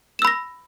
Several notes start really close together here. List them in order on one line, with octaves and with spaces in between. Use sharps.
E7 E6 B5 A#6